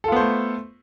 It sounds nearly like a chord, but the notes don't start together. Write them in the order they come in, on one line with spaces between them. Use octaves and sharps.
A4 F4 B3 C5 A3